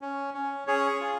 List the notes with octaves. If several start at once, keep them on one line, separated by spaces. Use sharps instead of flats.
C#4
C#4
C#4 G#4 C#5
F4